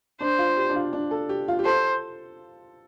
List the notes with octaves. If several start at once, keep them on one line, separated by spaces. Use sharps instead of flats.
D4 C5
F4
G4
D4
F4
D4
A4
G4
F4
G4
A4 C5